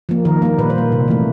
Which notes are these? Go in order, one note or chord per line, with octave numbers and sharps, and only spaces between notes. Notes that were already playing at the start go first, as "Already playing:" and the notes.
F3 A#3
D#3 A#4
G3 A#3
A#2 B4
C5
G3 A#3
C3
E3 A3